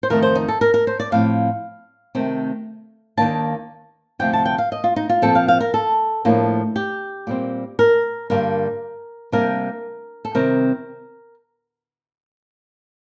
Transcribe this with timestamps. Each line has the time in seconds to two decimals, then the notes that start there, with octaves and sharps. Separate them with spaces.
0.03 C5
0.10 F2 D#3 A3 A#4
0.22 C5
0.35 D#4
0.48 A4
0.61 A#4
0.74 A#4
0.87 C5
1.00 D5
1.12 A2 F3 C4 F5
2.15 C3 D#3 A3 C4
3.17 D#2 D#3 A#3 D4 A5
4.19 D2 C3 F3 G5
4.33 A5
4.45 G5
4.58 F5
4.72 D#5
4.84 F4
4.96 D#4
5.09 F4
5.22 A#2 F3 C4 A4
5.35 F5
5.48 F5
5.60 A#4
5.74 A4
6.25 A2 F3 A#3 D4
6.76 G4
7.27 A#2 G3 C4
7.79 A#4
8.30 G2 D3 G3 A#3 D4 A#4
9.32 C3 G3 A#3 D4 A#4
10.25 A4
10.35 C3 D#3 G3 C4 A#4